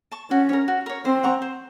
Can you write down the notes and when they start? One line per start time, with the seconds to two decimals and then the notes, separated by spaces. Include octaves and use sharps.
0.11 A5 C#6
0.30 C#4 F#4
0.49 A#4 C#5
0.68 F#4
0.86 A#4 C#5
1.05 C4 C5
1.23 F#5 A#5 C#6
1.42 C5